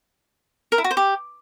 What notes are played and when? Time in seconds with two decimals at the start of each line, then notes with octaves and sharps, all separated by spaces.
0.72 A#4
0.78 E4
0.84 F#4
0.91 C5
0.97 G4